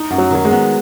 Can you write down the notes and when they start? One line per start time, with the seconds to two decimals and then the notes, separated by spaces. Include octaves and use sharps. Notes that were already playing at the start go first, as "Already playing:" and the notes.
Already playing: D#4
0.11 F#2
0.18 F#3
0.30 D#3 F#3
0.45 G#3
0.51 B3